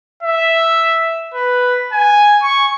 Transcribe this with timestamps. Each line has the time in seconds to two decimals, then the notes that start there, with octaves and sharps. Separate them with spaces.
0.23 E5
1.34 B4
1.93 G#5
2.42 C#6